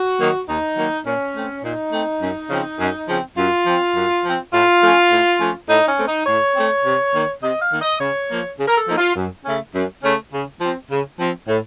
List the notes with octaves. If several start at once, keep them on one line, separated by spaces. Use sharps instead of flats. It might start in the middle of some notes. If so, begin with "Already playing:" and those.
Already playing: F#4
D#3 F#3 A#3
D#2 D#4
D#3 F#3 A#3
A#2 C#4
A3 C4
A#2 D#4
A3 C4
F#2
C#3 F3 C4
F#2
C#3 F3 C4
F#2 F4
F3 C4
F#2
F3 C4
A2 F4
F3 A3 C#4
A2
F3 A3 C#4
A2 D#4
C#4
A3 C4
D#4
A2 C#5
A3 C4
C3
D#3 A#3
C3 D#5
F5
D#3 A#3
D#5
C#3 C#5
F3 A#3
C#3
A#4
A4
F3 A#3 D#4
F4
F#2
C#3 A3 C#4
F#2
C#3 A3 C#4
C#3
F3 C4
C#3
F3 C4
A2